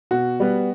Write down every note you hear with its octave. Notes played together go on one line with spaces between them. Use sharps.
B2 F#4
G3 B3